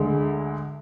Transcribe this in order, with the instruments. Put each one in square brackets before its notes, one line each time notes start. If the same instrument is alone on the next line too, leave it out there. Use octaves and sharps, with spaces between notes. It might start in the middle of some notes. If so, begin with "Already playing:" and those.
Already playing: [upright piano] D2 D3 G#3